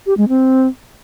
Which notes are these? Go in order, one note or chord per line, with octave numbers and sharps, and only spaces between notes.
G4
G#3
C4